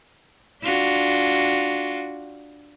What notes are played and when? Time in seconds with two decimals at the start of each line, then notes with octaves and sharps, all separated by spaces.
0.63 D4 F4 F#4